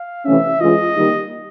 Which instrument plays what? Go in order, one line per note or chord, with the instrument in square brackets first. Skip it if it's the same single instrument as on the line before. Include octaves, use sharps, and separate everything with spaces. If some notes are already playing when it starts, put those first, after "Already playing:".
Already playing: [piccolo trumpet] F5
[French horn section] C3 E3 A3 C#4 [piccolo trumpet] E5
[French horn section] E3 G#3 C#4 F4 G#4 [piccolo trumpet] D#5
[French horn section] D#3 G3 A#3 D#4 G4